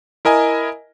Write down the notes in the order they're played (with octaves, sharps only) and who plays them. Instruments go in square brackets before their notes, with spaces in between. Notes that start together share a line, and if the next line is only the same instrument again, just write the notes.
[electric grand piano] E4 A#4 D#5 G#5